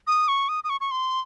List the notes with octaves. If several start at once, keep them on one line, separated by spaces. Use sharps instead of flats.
D#6
C#6
D#6
D#6
C#6
C#6
C6